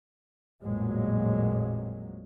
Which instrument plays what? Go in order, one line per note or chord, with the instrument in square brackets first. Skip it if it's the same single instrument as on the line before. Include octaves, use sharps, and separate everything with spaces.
[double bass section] A1 F2 A#2 F#3 G#3 A#3